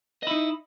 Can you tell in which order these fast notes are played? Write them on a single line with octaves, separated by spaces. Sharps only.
D#5 E4 D#4